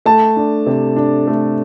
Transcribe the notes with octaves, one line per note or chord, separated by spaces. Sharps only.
A3 A5
D4
C3
D4
A3